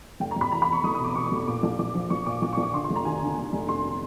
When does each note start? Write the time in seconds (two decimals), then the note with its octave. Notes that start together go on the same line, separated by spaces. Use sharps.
0.20 F1 G5
0.31 A#5
0.36 F1 B5
0.52 E2 A#5
0.62 B5
0.68 E2 C#6
0.84 F1 D#6
0.95 D#6
0.99 B2
1.04 D6
1.15 B2 C#6
1.26 D6
1.32 F1
1.47 A#2 D6
1.63 A#1
1.79 A#1 D6
1.95 F3
2.10 A#1 C#6
2.26 A#2 D6
2.42 A#1 D6
2.53 C#6
2.57 A#1
2.63 D6
2.74 D3 C6
2.84 C6
2.90 F1
2.96 A#5
3.05 D#2 G#5
3.22 D3
3.38 F1
3.53 F1
3.69 F1 C6